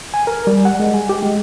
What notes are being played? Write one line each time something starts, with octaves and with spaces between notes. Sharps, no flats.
G#5
A#4
G3
F#5
G#3
G#5
G4
G#3